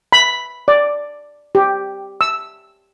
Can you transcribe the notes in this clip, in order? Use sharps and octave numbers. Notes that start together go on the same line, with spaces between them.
B5
D5
G4
E6